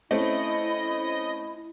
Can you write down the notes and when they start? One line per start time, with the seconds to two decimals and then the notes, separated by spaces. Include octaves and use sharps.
0.11 A3 C4 C#4 E4 D#5